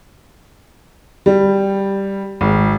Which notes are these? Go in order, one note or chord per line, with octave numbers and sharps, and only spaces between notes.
G3
G#1